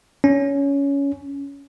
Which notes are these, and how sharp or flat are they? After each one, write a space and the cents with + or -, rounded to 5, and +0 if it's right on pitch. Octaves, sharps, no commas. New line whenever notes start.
C#4 +15